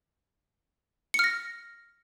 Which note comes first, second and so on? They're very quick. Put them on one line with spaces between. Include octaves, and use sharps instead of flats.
C#7 F6 A#6